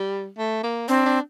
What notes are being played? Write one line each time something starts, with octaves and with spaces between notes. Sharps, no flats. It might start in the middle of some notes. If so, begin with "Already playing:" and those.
Already playing: G3
A3
A#3
C4 D4
D4